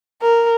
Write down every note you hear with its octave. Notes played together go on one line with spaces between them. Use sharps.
A#4